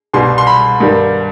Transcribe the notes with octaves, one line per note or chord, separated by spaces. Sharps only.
C2 B2 G3 C6
C6
B5
G2 D#3 G3